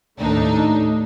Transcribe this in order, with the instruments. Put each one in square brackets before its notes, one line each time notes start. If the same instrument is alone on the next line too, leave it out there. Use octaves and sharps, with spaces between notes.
[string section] D#2 A2 A3 D4 D#4